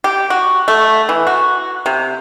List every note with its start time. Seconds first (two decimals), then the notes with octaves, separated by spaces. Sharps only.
0.04 G4
0.30 F#4
0.68 A3
1.09 E3
1.27 F#4
1.86 C3